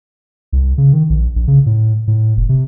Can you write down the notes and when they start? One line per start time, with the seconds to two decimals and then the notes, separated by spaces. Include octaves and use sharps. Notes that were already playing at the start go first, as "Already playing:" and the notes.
0.53 C2
0.78 C#3
0.93 D#3
1.10 A#1
1.36 A#1
1.48 C#3
1.66 A2
2.07 A2
2.37 F1
2.49 C3